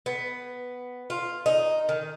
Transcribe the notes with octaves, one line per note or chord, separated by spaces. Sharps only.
B3
F4
D#4
D#3